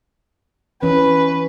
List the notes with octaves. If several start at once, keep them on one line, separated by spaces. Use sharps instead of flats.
E3 C#4 B4